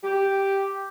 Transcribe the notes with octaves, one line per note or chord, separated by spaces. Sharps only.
G4